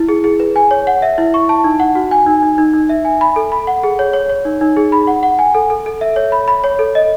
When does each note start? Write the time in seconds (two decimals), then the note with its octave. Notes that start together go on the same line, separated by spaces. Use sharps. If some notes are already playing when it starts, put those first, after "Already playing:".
Already playing: E4
0.08 G#4
0.24 G#4
0.40 B4
0.56 G#5
0.71 C#5
0.87 F#5
1.02 E5
1.18 E4
1.34 C#6
1.49 A5
1.64 D#4
1.80 F#5
1.95 F#4
2.11 G#5
2.27 D#4
2.43 D#4
2.58 D#4
2.73 D#4
2.89 E5
3.05 G#5
3.21 B5
3.36 A4
3.52 B5
3.67 F#5
3.83 G#4
3.99 C#5
4.13 C#5
4.29 C#5
4.45 D#4
4.61 D#4
4.76 G#4
4.92 B5
5.07 F#5
5.23 F#5
5.39 G#5
5.55 A4
5.70 A4
5.86 A4
6.01 E5
6.16 C#5
6.32 B5
6.48 B5
6.64 C#5
6.79 A4
6.95 D#5